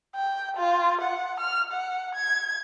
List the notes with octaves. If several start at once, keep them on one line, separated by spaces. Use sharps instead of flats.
G5
F4
F#5
F6
F#5
G#6